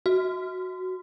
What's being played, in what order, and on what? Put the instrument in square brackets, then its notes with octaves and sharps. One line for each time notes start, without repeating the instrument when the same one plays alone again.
[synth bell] F#4